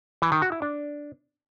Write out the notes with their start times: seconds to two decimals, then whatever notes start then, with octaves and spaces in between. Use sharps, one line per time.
0.22 E3
0.32 D#3
0.42 F#4
0.52 E4
0.62 D4